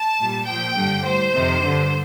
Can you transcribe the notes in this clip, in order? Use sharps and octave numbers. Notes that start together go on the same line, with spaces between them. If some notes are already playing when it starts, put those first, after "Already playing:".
Already playing: A5
A#2 G3
A#2 F3 G5
G2 D3 G3
A2 G3 C5
F2 C3 D#3
G2 D3 G3